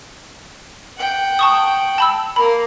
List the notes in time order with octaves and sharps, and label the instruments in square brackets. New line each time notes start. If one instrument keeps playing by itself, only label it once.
[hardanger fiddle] F#5 G5
[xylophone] A5 C#6 D#6
A5 B5 E6
[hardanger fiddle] A#3 A#4 [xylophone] B5